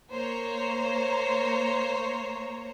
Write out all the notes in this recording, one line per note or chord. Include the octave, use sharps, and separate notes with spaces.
A#3 C5 C#5 A#5